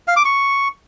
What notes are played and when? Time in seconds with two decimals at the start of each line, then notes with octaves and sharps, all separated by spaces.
0.08 F5
0.16 D6
0.25 C#6